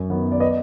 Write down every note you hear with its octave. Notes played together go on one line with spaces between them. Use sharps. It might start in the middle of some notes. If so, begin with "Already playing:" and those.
Already playing: F#2
D#3 F#3 B3
D5
B4 D#5